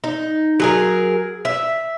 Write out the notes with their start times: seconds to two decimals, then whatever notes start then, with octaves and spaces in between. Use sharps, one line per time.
0.04 D#4
0.60 F#3 G#4 A#4
1.45 E5